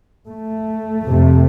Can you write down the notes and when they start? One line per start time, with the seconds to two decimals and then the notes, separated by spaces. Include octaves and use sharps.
0.29 A3
1.04 F2 C3